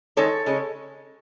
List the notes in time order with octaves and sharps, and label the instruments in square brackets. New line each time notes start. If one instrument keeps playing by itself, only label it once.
[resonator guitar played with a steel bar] D#3 G#3 D#4 A4 C#5
C#3 G#3 C#4